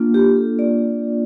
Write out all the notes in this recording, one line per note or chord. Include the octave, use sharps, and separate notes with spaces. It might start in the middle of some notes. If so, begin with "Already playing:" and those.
Already playing: A#3 D4 F4
G4
A4
D5